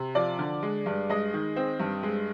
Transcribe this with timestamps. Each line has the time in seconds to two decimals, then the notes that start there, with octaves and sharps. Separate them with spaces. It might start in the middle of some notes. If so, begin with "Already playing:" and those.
Already playing: C3
0.15 F3 D5
0.39 D3
0.63 G#3
0.86 G2
1.09 G#3 D#5
1.34 D#3
1.56 C4
1.80 G2
2.03 G#3